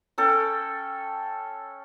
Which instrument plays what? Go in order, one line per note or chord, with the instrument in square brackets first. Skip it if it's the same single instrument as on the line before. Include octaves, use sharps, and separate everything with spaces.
[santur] C#4 A4 G5